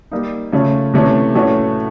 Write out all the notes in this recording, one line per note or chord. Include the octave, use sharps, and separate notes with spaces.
G3 A#3 D#4
C#3 F3 A3 C#4
C3 E3 A3 C#4
A2 E3 A3 C#4 F#4